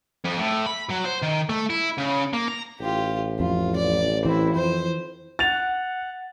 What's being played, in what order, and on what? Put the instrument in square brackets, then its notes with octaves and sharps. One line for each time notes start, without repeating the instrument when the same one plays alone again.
[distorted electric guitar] F2
A2
B5
F#3
C5
D#3
A3
E4
C#3
A#3
A#5
[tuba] A1 [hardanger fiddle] F4 G4
[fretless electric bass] F2 [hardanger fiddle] F4
[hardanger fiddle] D5
[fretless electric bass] E3 [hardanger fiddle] C4 E4
[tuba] F2 [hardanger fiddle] C5
[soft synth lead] F#5 [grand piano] A6 F7